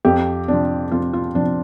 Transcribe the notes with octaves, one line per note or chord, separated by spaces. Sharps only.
F2 G4
C3 F3 D4
F2 F4
F4
C3 F3 D4